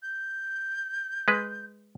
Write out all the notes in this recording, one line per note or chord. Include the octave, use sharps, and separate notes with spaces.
G6
G#3 B4